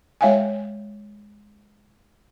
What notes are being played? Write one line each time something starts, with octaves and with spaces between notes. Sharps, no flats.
G#3 C#5 E5 F5 G5 G#5